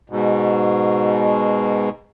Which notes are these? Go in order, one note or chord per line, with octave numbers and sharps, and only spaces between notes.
G#2 B2